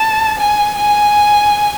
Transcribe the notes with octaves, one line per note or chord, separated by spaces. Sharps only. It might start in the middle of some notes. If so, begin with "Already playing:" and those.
Already playing: A5
G#5
G#5